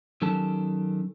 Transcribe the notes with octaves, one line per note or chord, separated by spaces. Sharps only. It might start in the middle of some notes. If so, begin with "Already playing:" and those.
D#3 F#3 C#4 G4 A4 A5